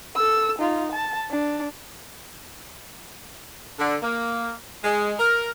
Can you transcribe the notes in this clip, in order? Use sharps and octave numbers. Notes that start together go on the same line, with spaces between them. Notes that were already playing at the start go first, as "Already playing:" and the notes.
A4 E6
D#4 F4
A5
D4
D3
A#3
G#3
A#4